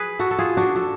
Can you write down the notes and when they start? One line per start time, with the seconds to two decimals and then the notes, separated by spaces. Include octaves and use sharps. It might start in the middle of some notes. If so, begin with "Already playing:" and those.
Already playing: G#4 B4
0.19 F#4 A4
0.31 A4
0.39 F4 G#4
0.57 D4 F#4
0.76 F#4 A4